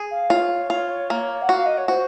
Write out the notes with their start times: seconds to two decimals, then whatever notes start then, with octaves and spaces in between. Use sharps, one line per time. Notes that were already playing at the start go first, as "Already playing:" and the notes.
Already playing: G#4
0.11 F5
0.30 F4 C#5
0.70 F4
1.10 A#3
1.42 F#5
1.49 F#4 F5
1.65 D#5
1.77 C#5
1.88 F#4 C5